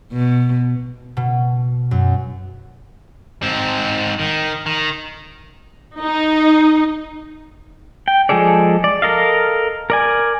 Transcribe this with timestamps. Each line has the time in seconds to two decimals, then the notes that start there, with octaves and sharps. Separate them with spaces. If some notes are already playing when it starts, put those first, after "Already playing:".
0.12 B2
1.17 B2
1.91 F#2
3.43 G#2 C4
4.19 D#3
4.66 D#3
6.00 D#4
8.08 G5
8.29 F3 G#3 G#4 A4 D5
8.84 D5
9.02 A4 A#4 D#5 F5
9.90 A#4 D5 G#5